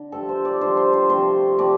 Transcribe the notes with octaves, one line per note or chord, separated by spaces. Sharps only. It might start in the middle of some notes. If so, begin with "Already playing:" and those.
Already playing: D3
G2 F3 A3 A4
C5
D5
G2 F3 A3 C5
C5
C5
C3 F3 A3 C5
C3 F3 A3 D5